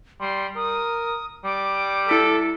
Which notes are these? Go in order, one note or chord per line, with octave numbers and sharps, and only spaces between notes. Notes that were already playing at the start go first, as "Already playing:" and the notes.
G3 C6
A#4 D#6
G3 D6
E4 A4 B6